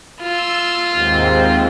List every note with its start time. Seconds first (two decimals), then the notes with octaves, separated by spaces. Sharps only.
0.21 F4 E6
0.92 D#2 G#2 C4